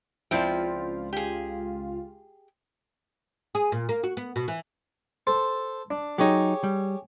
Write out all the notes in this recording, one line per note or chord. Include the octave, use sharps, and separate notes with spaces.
C#2 F3 C4 E4 F4 D5 G5
G4 G#4
G#4
A#2
A#3
F#4
B3
B2
E3
A4 C5
D4
F#3 D#4 G4 G#4 C#5
G3